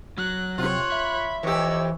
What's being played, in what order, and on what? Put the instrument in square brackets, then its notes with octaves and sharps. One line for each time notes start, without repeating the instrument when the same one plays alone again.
[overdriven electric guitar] F#3 [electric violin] F#6
[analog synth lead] C3 [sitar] F4 [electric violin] C#5 F#6
[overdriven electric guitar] E5 [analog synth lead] B5
[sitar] F2 G4 [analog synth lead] E3 [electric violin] C#5 E6